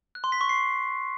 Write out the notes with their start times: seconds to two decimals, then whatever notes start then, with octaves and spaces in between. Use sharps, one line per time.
0.15 F#6
0.24 C6
0.32 B6
0.41 C#6
0.49 C7